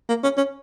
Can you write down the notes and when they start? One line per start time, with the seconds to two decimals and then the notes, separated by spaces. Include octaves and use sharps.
0.09 A#3
0.24 C#4
0.37 C#4